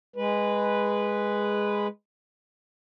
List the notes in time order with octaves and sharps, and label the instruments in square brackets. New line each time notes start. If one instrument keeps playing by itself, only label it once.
[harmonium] G#3 B4